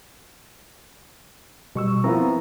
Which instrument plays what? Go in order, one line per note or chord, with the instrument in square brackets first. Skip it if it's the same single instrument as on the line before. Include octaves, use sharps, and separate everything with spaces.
[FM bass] B2 [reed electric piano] G3 C#6 E6
[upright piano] F3 B3 [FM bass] C4 [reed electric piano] E4 A#4 A#5